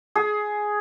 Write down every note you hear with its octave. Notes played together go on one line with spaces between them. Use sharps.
G#4